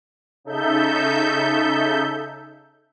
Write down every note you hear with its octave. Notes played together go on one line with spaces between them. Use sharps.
C#3 D#4 A4 E5 G6